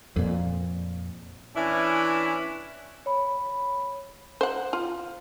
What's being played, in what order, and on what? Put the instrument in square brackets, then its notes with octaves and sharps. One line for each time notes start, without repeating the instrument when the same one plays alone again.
[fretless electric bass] F2 A#2
[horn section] E3 C#4 D4 E4
[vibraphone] C#5 B5
[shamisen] C5 F#5
F4